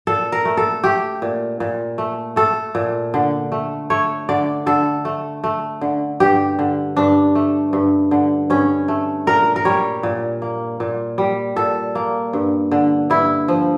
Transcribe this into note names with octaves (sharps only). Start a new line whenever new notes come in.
A#2 A4
A#4
A3
A4
A3 G4
A#2
A#2
A3
A3 A4
A#2
D3
A3
A3 C#5
D3 D5
D3 A4
A3
A3
D3
G2 G4
D3
G2 D4
A3
G2
D3
G2 C#4
A3
A#2 A#4
A#4
G3 C#5
A#2
A#3
A#2
G3
A#2 A4
A#3
G2
D3
G2 E4
F3